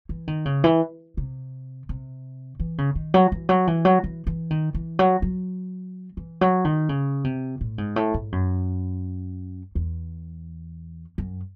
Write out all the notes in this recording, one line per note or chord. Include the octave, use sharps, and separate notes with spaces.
E3
D#3
C#3
E3
C3
C3
E3
C#3
D#3
F#3
E3
F#3
E3
F#3
E3
E3
D#3
E3
F#3
F#3
E3
F#3
D#3
C#3
C3
A2
G#2
A2
G#2
F#2
E2
F#2